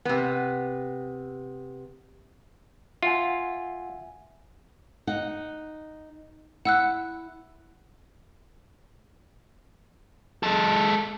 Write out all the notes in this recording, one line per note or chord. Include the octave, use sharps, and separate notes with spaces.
C3 B3
F4 E5 F#5 G#5
D#4 F#5
E4 F#5 E6 F#6
G#3 A4